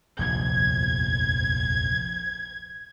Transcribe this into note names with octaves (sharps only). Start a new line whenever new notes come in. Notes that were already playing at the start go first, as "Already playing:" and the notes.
F1 A#1 D#2 G#6